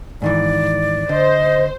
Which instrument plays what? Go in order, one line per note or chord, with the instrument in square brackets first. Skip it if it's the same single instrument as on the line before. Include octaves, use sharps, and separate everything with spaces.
[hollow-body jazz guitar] G#2 D#3 E3 [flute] D5
[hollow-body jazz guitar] D3 [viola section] C5 [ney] D#5